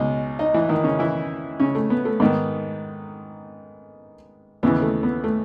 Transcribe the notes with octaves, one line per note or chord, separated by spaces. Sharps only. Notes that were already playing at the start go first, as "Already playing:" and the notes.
Already playing: C#2 B2 D#4 D#5
D#4 D#5
E3 E4
D#3 D#4
C#3 C#4
E3 E4
C#3 C#4
A3
B3
A3
G#2 D#3 B3
D#2 C#3 E3 B3
A3
B3
A3